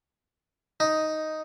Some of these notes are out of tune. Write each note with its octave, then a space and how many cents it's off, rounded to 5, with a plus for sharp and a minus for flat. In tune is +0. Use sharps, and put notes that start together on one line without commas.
D#4 +5